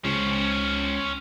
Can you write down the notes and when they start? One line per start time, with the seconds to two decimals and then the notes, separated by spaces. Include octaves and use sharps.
0.04 C#2 C#4 C5